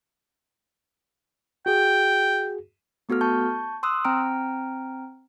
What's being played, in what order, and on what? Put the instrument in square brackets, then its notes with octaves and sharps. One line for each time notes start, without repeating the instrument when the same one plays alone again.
[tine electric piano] F#4 G#4 [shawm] G5
[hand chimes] A3 B3 F#4 A4 F6
A5 C#6 G6
C6 D#6 E6 F#6
C4 G5 A#5 F6 D7